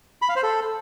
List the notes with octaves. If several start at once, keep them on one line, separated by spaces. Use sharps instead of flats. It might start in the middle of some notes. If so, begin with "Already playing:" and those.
B5
F5
C5
A4